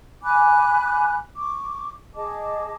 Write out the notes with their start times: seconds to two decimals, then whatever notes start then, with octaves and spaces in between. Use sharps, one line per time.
0.23 G#5 B5 D6 F#6
1.37 C#6 D6
2.15 G#4 D#5 A5 D6